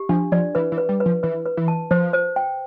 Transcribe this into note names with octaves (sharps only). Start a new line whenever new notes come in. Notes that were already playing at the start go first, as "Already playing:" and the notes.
Already playing: G4
F3 D4
F3 D5
E3 B4
E3
B4
G3
B4
F3
E3 B4
B4
E3
A5
F3 C5
C5
G5